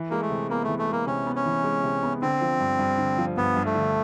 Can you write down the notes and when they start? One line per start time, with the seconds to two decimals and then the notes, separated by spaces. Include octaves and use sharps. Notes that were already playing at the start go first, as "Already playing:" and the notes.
Already playing: E3
0.10 G#3 A#3
0.21 A3
0.30 C3
0.50 A#3 B3
0.64 E3 A3
0.79 A3
0.88 G#3 A#3
1.07 C3 C#4
1.26 B3
1.36 C#4
1.46 E3
1.64 G#3
1.84 C3
2.03 B3
2.22 D3 C4
2.41 F3
2.60 G2
2.79 G2
2.98 D3
3.18 F3
3.37 G2 B3
3.56 G2
3.66 A3
3.75 D3